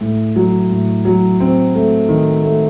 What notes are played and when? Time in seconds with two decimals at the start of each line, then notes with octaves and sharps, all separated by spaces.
0.01 A2
0.36 F#3
0.71 A2
1.05 F#3
1.40 C4
1.75 A3
2.09 D#3
2.44 A3